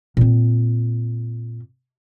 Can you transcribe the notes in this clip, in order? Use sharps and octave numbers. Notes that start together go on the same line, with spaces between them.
A#2 C4